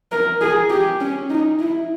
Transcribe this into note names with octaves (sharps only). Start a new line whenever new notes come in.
A#4
G#4
G4
C#4
D#4
E4